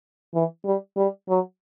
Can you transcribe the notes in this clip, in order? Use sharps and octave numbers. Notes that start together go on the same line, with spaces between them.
E3
G3
G3
F#3